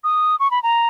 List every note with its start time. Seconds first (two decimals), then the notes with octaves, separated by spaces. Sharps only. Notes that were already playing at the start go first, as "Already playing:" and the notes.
0.04 D#6
0.40 C#6
0.51 B5
0.63 A#5